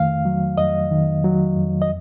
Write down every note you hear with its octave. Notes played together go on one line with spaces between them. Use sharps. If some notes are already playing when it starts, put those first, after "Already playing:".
Already playing: F2 D#3 A3 F5
F#3
F2 D#5
D#3
F#3
F2
D#5